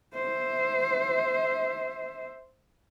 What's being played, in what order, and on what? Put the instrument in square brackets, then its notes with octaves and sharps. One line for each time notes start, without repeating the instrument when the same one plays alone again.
[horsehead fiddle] C5 E5